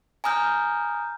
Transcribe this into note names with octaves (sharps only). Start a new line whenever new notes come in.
G#5 A#5 D#6 F6 G6